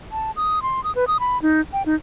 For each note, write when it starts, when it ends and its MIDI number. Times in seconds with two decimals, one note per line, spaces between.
0.12 0.31 81
0.36 0.62 87
0.62 0.83 84
0.84 0.94 87
0.95 1.07 71
1.07 1.17 87
1.20 1.41 83
1.42 1.61 63
1.73 1.82 79
1.86 1.95 63